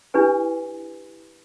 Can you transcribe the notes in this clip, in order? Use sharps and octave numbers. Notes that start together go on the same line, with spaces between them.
D4 E4 G4 B4 G#5